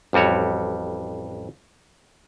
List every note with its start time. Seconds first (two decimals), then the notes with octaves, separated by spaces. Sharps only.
0.13 A1 F2 G3 F#4 C#5